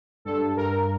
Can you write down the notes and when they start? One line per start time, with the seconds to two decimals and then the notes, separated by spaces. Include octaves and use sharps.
0.25 G2 A4
0.57 G2 A#4